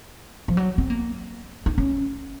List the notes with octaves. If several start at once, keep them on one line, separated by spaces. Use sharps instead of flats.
F3
F#3
C4
A#3
D#4
C#4